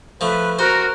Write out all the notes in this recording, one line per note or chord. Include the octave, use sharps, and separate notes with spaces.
F3 A3 B4
F#4 A#4 C5